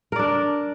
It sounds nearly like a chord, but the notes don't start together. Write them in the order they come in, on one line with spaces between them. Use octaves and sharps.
A#4 D5 D4